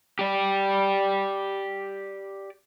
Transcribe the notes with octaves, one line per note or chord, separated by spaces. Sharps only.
G4 D5